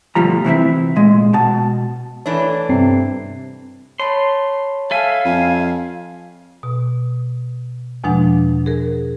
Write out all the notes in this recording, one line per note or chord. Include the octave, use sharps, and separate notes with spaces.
D2 B2 F3 G3 A#5
C3 E3 C4 E4
A#2 G#3
B2 A5
E3 A3 D4 C#5
G2 C3 C4 C7
C#5 A5 B5 C6
A4 E5 F5 G#5
F2 G#5
B2
E2 B2 F3 G#3 D4 F#5
G#4 A#4